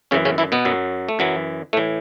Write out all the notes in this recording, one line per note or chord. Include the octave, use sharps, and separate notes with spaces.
F#2 C#3 E3 C#4
C#3 C#4
E3 E4
B2 B3
F#2 F#3
A3
F#2 E3 F#3
A2 E3 A3